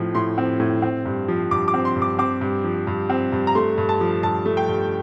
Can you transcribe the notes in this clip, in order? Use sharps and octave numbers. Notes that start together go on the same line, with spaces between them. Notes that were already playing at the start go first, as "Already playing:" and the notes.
Already playing: A2 F3 C4
A2 C6
C4
A2
C4
G2
F3
G2 D6
D6
C4
C6
G2
D6
C4 D6
G2
F3
G2
C4
G2
A#5
A3 C6
G2
A5
F3
G2 A5
A3
G5
G2